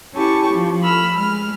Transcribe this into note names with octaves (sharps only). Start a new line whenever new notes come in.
C#4 E4 G4 A5 C#6
F3
B5 E6 F6
G#3 F6